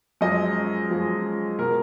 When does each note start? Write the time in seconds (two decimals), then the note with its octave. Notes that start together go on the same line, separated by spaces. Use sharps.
0.21 F#2 F3 G#3 D#5
0.90 F#2 F3 G#3
1.59 B2 G#3 A#4